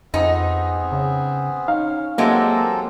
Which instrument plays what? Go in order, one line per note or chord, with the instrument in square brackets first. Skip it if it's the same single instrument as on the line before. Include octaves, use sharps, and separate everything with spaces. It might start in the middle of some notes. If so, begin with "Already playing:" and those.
[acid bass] F2 [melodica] B3 C4 G#4 [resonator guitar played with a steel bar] D#4
[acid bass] C#3
[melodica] C#4 [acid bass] D#4 [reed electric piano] F5
[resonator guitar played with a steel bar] F#3 G#3 G4 [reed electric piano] A#3 E5 [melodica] C4 A4 A#4